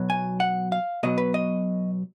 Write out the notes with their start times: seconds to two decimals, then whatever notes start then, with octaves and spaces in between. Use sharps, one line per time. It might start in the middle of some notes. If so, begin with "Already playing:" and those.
Already playing: B1 B2 F#3
0.10 G#5
0.40 F#5
0.72 F5
1.03 B1 B2 F#3 D#5
1.18 B4
1.34 D#5